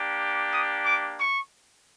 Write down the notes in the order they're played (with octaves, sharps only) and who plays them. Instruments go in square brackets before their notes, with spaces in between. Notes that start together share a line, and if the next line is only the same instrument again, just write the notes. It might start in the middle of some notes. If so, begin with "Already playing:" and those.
Already playing: [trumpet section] A#3 D4 G4
D#6
D6
C#6